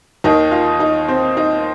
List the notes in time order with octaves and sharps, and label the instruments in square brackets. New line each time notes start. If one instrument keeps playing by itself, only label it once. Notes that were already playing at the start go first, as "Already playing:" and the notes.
[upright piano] D#2 D#3 D#4
F4
D#4
C4
D#4